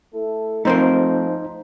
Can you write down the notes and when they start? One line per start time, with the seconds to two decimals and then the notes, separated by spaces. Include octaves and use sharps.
0.13 A3 E4 A4
0.65 F3 A3 C4 D#4 A#4 C5